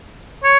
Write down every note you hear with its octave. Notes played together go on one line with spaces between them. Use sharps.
C#5